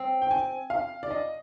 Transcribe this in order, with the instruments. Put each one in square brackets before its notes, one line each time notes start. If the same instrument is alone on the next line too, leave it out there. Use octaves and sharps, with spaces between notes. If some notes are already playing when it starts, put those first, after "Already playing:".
Already playing: [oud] C4
[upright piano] G5
G#5
F5
D5
D#5